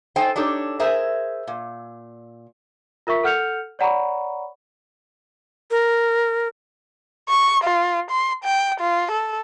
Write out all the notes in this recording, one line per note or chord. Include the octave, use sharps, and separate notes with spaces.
D#4 A4 C5 G5 G#5
D4 D#4 G4 A4 C#5
G#4 A#4 C5 E5
A#2
F4 A#4 E5 C#6 B6
A4 F#5 F6 G6 C#7 F7
C#5 D5 F#5 A#5 B5 C#6
A#4
C#6
F4
C6
G5
F4
A4